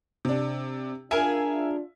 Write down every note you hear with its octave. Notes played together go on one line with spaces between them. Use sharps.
C3 D4
D4 F4 G#4 A#4 E5 G#5